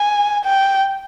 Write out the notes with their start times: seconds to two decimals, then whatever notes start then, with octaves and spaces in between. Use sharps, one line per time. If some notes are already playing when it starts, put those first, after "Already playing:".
Already playing: G#5
0.45 G5